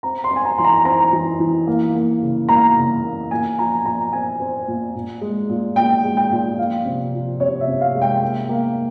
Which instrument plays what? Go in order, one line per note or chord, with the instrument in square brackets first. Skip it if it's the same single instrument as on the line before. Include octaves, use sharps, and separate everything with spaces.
[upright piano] C4 A#5
C6
C4
G#5
A#5
E3 C6
A#5
C4 A#5
E3
E3
A#3
A#3
C#3
A#3 A#5
C#3
A#3
A#2 G#5
F3 A#5
A#2 A#5
C4 G#5
C4
A#2
A#2
G#3
A#2
A#2 G5
G#3
G5
A#2
F3 F5
C3
F3
C3 C#5
E5
C3
F5
G#3
G5
A#3
A#3